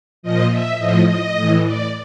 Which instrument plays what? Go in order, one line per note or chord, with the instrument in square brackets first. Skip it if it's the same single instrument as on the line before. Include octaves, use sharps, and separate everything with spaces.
[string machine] A#2 F3 D#5
E5
A2 F3 D#5
D#5
A2 E3
D5